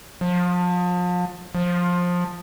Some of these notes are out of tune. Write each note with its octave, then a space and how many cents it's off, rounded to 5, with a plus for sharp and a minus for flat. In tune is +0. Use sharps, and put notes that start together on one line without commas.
F3 +35
F3 +20